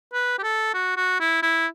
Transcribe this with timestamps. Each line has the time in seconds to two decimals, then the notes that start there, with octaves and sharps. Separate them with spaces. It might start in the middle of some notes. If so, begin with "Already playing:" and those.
0.13 B4
0.39 G4
0.43 A4
0.74 F#4
0.97 F#4
1.20 E4
1.43 E4